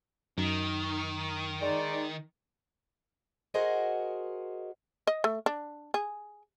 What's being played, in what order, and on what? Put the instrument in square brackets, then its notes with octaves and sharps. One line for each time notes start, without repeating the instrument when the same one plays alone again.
[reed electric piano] F#2 [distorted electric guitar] D#3
[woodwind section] G#3 D#4 D5
[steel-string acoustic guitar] F#4 G#4 A#4 C5 D#5 F#5
[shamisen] D#5
A3
D4
G#4